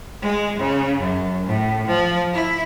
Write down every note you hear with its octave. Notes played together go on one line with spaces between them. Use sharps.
G#3
C#3
F#2
A2
F3
E4